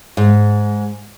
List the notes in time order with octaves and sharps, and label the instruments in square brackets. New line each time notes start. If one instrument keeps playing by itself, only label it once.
[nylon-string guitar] G#2